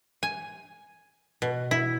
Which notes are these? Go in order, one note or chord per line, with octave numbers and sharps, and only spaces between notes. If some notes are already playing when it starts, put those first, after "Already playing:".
G#5
B2
E4